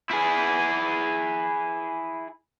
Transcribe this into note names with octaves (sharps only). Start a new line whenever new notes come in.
E4 G#4